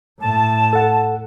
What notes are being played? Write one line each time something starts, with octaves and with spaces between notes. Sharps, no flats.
A2 A5
A4 F#5